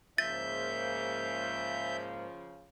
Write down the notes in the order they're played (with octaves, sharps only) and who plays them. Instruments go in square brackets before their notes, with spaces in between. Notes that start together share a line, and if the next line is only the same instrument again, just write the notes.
[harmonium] G#2 A#3 [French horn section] C#3 F3 [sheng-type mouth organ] E5 G6 [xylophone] A6